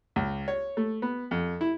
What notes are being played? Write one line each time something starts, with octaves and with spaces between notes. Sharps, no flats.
C#2
C#5
A3
B3
F2
E4